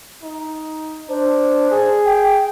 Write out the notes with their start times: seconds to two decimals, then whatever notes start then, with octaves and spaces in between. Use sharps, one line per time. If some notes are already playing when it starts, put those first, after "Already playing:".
0.23 D#4
1.09 D4 C5
1.71 G#4
2.06 G5